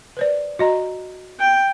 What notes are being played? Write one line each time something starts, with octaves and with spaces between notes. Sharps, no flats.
B4 C5 D5
F#4 D#5 A#5
G5